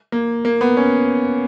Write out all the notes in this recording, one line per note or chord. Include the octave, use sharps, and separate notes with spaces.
A#3
A#3
B3
C#4